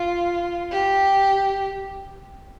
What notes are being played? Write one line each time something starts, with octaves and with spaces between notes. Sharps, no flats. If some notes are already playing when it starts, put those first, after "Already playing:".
Already playing: F4
G4